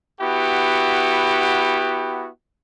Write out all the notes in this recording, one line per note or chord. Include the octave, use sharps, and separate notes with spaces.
B3 E4 F#4 G4